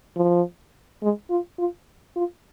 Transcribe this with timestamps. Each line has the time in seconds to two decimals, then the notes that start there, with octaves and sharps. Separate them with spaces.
0.16 F3
1.02 G#3
1.30 F4
1.58 F4
2.16 F4